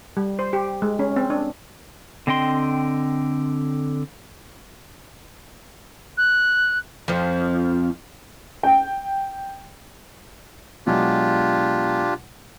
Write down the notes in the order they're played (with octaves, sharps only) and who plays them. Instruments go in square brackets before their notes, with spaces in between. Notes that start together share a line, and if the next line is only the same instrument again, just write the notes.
[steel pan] G3
C5
G4
G#3
C#4
C4
D4
[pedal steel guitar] D3 C4 D#5 G5 C6
[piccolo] F#6
[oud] F2 F3
[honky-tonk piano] G5
[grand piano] B2 F#3 G#3 [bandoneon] D4 F4 G4